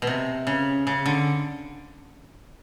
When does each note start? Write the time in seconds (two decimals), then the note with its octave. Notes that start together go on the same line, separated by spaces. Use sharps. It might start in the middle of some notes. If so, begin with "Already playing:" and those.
0.02 B2
0.07 C3
0.47 C#3
0.87 C#3
1.06 D3